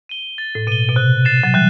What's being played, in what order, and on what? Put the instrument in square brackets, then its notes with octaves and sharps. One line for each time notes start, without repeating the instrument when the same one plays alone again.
[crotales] D#7 G7
A6
[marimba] A2
[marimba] B2 [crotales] D#7 G7
[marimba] B2
[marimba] C3 [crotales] F#6
[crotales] A6 C7 E7
[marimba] F#3
[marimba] E3 G3 [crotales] F#6